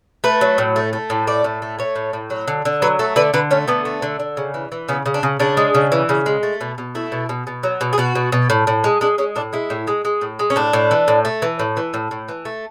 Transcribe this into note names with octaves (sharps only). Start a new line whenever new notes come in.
A3 B4
F#3
A2
A3
A3
A2
A3 D5
A2
A3
A3 C#5
A2
A2
F#3
D3
D3
F#3 B4
A3 A4
D3 B4
D3 B4
A3 C#4
D3 B3
A3
D3
D3
C#3
E3
E3
C#3 B3
C#3
D4
C#3
C#3 D4
G#3
C#3
E3
C#3
G#3
A3
B2
B2
A3 E4
B2
B2
B2
F#3
B2
G#4
B2 F#4
B2
B2
A2
A2
G#3
G#3 D4
G#3 C#4
A2 D4
G#3 E4
A2
G#3
G#3
A2
G#3
C#4
A2 D4
A2
E3
A2
A3
E3
A2
E3
A2
A2
E3
A3